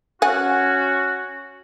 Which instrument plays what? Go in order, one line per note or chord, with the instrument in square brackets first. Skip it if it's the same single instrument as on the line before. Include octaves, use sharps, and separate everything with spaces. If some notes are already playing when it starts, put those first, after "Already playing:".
[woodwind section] C#4 F#4 [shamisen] F#5 G#5